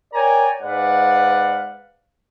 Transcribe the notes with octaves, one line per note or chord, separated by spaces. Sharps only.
A#4 C#5 D5 G5 G#5 A#5
G#2 B4 D5 F5 F#5